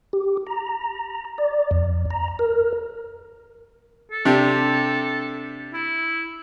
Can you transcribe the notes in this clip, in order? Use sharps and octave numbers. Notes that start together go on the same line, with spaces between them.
G4
A#5
D5
F2
A#5
A#4
A4
C3 D4 G4
E4